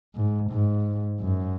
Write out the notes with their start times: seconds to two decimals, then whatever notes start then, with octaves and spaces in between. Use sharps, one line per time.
0.15 G#2
0.50 G#2
1.21 F#2